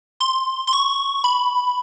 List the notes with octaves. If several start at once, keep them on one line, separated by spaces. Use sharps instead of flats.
C6
C6
C#6
B5